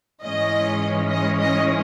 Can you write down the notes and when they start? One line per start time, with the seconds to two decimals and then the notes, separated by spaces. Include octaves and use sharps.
0.22 G#2 E3 G#3 C#4 D#5
1.09 D#5
1.39 D#5